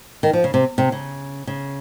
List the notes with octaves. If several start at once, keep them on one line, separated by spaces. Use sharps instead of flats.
D#3
F3
C#3
C3
C3
C#3
C#3